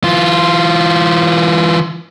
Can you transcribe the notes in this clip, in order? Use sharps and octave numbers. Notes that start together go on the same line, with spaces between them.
E3 F4